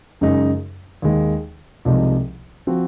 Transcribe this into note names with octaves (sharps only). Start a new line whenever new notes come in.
F#2 C#3 G#3 D#4
D#2 D#3 G#3
C2 C3 F3 G#3 D#4
F3 C4 F#4